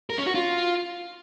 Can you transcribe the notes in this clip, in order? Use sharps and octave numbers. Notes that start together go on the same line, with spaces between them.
A#4
C#4
F#4
F4